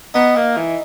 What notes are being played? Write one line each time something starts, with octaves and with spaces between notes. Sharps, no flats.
B3 D#4
A#3
E3